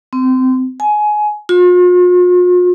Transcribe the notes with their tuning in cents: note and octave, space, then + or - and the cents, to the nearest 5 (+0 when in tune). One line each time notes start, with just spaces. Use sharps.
C4 -25
G#5 +20
F4 +45